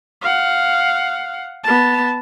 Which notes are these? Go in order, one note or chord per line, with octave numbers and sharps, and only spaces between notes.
F5 F#5
B3 A5